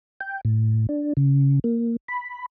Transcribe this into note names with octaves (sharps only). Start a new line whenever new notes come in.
G5
A2
D4
C#3
A#3
B5